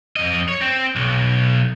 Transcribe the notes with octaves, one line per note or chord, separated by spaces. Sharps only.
F2 D#5
C#5
C4
B1